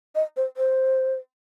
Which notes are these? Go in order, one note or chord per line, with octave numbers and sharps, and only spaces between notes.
D#5
C5
C5